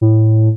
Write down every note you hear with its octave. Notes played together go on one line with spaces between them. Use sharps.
A2